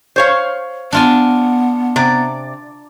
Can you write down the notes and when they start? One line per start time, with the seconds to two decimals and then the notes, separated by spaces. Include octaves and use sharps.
0.16 C5 C#5 F5
0.93 B3 D4 F4 G#5
1.96 C3 D5